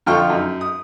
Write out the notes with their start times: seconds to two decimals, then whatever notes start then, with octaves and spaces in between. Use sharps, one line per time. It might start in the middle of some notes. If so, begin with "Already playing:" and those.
0.06 F2 D3 F4 G5 C#6 F6
0.30 F#2 D#4
0.61 D#6